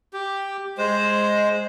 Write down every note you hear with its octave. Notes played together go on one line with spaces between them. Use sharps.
G4
G#3 C5